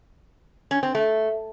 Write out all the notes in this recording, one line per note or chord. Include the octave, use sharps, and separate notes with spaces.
C#4
C4
A3